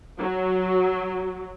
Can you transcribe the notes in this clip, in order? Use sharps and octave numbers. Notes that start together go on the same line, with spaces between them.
F#3